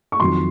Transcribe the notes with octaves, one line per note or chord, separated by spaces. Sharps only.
C#6
F2 D#3 F#3 C6